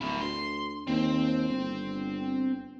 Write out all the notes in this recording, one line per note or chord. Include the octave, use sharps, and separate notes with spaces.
D1 E4 A#4
D2 C6
D#2 C4
G1